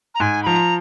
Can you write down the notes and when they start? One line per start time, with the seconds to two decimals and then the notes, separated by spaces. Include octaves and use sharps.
0.15 A#5
0.20 G#2 G#5
0.43 B5
0.47 F3 A#5